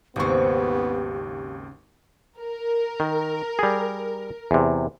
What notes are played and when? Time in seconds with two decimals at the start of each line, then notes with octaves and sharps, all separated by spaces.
0.16 G#1 D#2 C#3 B3 C4 G4 C#6
2.39 A#4
3.00 D#3
3.59 G3 G#4
4.51 E2 C3